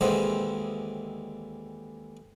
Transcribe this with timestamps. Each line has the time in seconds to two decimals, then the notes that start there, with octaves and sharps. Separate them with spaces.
0.01 D#2 D3 E3 G#3 C4 C5